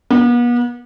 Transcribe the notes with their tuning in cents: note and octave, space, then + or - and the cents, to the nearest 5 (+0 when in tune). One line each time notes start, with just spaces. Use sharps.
B3 -40